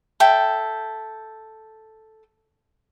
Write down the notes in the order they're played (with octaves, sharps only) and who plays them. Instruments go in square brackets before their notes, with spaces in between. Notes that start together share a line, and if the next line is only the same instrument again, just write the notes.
[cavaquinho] A4 E5 G5